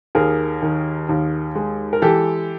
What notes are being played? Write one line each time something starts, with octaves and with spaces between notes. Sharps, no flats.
D#2 G#4 A#4
D#3
D#2
G#3
A#4
E3 G4 A4